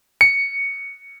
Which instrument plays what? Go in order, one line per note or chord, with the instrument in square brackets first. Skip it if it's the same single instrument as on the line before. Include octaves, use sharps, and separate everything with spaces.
[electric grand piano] C#7